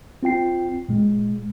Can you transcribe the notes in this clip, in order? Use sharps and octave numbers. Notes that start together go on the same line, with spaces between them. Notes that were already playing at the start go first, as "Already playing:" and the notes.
C4 F4 G5 C7
A#2 G#3